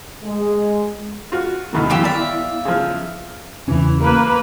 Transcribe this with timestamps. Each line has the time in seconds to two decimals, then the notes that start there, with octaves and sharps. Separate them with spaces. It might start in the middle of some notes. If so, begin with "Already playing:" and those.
0.24 G#3
1.32 F4 F#4
1.73 D2 B2 D#3 B3 E4
1.90 F#2 E3 F4 G4 E6
2.04 D5 E5 F5
2.65 C#3 F3
3.68 E2 C#3 E3 C#4
4.00 A#3 B4